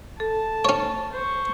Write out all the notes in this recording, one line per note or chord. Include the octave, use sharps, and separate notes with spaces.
A4 A5
C#4 C#5
C5 C#6